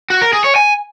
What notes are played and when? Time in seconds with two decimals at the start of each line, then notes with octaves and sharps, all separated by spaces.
0.10 F#4
0.22 A#4
0.33 G#4
0.44 C#5
0.56 G#5